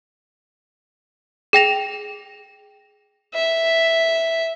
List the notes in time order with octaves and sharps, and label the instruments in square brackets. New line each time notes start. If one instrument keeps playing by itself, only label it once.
[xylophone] G#4 G5 A#6 F7
[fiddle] E5